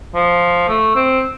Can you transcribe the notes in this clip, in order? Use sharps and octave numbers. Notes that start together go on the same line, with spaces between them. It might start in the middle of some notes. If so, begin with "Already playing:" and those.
F3
A3
C4